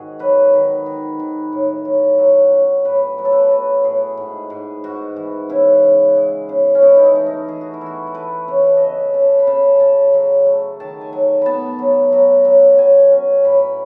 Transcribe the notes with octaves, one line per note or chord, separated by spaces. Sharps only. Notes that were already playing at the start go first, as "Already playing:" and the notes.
Already playing: G#2 D#3 F#4 G#4
F#3 B4
D#3
D#3
D#3
A2
F#3
F#3
C#4
A2 B4
F#3 B4
A4
B4
F#3 A4
A2 G#4
G#2
G#2
G#2 F#4
E3
C#3 E4
C#3
G#3
C#3
C#4
E3 D#4
E4
D#4
A3
D#4
E3 G#4
F#4
E4
E3 F#4
A4
A3 B4
C#3 C#5
C#3 D#5 E5
C#3 A5
B5
C#3 A5
C#3 A5 B5
F#3
A3
D#3 A5
G#5
F#3
B3 A5 B5
F#3
F#3
F#3
F#3 G#5
C#4
A2 B5